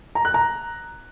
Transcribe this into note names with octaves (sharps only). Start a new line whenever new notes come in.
A#5
F#6
A#5